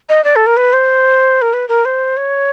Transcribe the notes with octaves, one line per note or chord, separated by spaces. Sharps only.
D#5
D5
A4
A#4
B4
C5
A#4
B4
A#4
C5
C#5